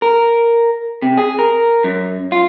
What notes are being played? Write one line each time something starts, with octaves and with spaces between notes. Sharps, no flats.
A#4
C3
G#4
A#4
F#2
F4